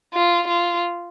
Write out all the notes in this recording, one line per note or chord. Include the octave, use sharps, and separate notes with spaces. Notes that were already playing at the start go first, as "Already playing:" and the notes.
F4
F4